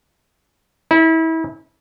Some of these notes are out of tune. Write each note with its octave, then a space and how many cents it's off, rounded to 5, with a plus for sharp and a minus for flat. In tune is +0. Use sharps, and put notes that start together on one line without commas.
E4 -30